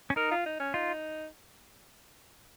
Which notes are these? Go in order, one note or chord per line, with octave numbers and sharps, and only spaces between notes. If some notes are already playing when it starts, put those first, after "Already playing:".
C#4
D#4 A#4
F4
D#4
C#4
D#4 F4